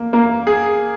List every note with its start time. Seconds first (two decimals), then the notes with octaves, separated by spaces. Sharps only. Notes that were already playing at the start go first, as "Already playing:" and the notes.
Already playing: A#3
0.13 A#3
0.47 G#4